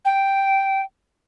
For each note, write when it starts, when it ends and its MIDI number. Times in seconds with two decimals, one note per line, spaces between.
0.05 0.81 79